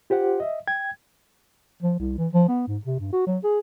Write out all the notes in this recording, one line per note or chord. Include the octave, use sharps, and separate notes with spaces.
F4 G4 C5 F#5
D#5 E5
G5 G#6
F3
C2
E3
F3
B3
G#2
C3
G2
F#4
F#3
G#4